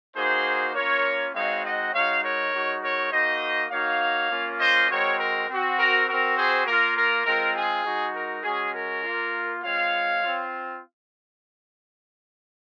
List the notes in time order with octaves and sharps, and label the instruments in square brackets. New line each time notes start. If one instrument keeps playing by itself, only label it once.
[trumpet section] A#3 D#4 F#4 G#4 C5
A#3 C#4 F4 A#4 C#5
G#3 C4 D#4 F#4 C#5 F5
D#5 F#5
G#3 D#4 F#4 C#5 F5
A#4 C#5
G#3 D#4 F#4
A#4 C#5
A#3 D#4 F#4 C5 D#5
A#3 D#4 F#4 C#5 F5
A#3 C#4 F4
C5 D#5
G#3 C4 F#4 A#4 C#5
A#4
C4 F#4
A#4
C4 F#4 A#4
G#4 C5
A#3 F4 A#4
A#4
G#3 C4 F4 A#4
G#4
G#3 D#4 F#4
A#4
G#3 C#4 F#4 G#4
A#4
A#3 F4
G#3 C4 F4 C#5 F5
C4 F4